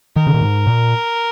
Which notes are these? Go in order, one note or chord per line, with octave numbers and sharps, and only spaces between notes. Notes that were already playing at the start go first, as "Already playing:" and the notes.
D#3 A#4
C#3
A#2
G#2
A#2